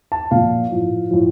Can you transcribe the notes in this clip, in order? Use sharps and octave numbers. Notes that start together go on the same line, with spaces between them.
A5
A#2 F3 F5
A2 F3
A2 F3